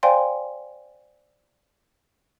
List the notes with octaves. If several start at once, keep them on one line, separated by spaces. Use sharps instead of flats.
C5 D5 F5 G5 G#5 C6